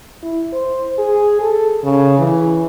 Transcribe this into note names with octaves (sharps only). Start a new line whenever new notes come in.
E4
C5
G#4
A4
C#3
E3